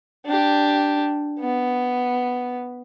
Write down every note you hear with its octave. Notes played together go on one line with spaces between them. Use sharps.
D4 G4
B3